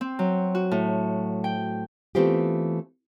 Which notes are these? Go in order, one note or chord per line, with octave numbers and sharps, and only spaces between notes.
C4
F#3
F#4
A2
G5
E3 A3 B3 C4 F4 G4